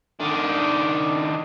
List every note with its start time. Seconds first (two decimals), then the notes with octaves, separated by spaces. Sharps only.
0.20 D#3 D4